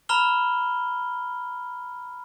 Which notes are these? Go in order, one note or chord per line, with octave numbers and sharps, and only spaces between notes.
A#5 B5 F6 G7